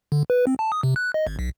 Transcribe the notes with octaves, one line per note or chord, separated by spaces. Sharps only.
D3
B4
C4
A5
D#6
C3
F#6
D#5
G#1
B1